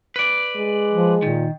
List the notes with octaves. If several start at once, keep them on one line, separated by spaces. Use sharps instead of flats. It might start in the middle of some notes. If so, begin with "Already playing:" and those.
B4 D5
G#3
F3
A#2 D#3